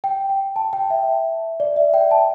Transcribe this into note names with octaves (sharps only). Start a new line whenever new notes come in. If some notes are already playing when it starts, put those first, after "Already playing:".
G5
G5
A5
G5
E5
D5
E5
G5
A5